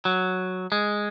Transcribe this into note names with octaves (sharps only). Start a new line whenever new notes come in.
F#3
G#3